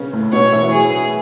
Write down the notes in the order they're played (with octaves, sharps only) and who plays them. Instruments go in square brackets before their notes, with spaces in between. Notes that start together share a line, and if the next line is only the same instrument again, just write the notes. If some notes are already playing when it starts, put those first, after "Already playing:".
Already playing: [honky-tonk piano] C#3 B3 C#4
A2 A3
[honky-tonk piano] B2 B3 [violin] C#5
[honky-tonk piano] A2 A3
E3 E4
F#3
[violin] G#4